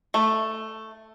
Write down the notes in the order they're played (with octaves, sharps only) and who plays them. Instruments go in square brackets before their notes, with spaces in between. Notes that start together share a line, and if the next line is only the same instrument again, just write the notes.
[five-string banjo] A3